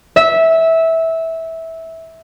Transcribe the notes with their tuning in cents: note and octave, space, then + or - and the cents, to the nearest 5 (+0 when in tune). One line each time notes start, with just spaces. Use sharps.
E5 -15